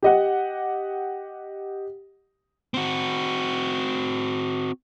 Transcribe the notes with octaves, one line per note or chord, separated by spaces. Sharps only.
G4 D#5 F#5
C4 F#4